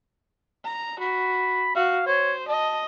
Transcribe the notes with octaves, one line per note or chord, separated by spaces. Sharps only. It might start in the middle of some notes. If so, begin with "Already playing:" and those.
A#5
F#4 B5
F#4 F5
C5 C#5
D#5 A5